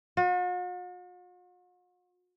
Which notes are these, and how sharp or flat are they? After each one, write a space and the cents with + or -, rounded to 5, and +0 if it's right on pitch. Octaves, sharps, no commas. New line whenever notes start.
F#4 -45